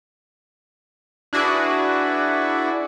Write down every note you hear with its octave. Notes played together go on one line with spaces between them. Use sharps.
D4 E4 F#4 G#4 B4